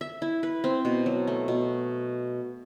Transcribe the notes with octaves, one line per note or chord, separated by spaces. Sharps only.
E5
E4
B4
C4
B2
F#3
A3
B2